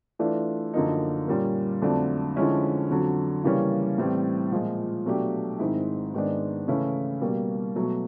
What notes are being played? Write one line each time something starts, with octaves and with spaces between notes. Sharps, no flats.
E3 A3 D4 F4
F#2 D3 F3 A#3 D#4
A#2 G3 A#3 C#4
F2 D3 F#3 A3 D4
D3 F3 G#3 C#4 E4
F2 D3 F#3
C#3 E3 G3 A#3 C#4
A2 E3 G3 C4
A#2 F3 G#3
B2 F#3 A3 D4 G4
G#2 D#3 G#3 C4 E4
G#2 D#3 G#3 B3 D4
C#3 E3 A3 C#4 E4
B2 G3 A#3
B2 F#3 A3